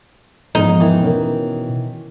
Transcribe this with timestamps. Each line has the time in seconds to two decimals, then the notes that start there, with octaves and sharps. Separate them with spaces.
0.55 E2 G#2 F3 D#4
0.80 D#3 E3
1.01 B2 B3 C#4 A#4